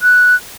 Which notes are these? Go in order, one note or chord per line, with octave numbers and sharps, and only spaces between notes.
F#6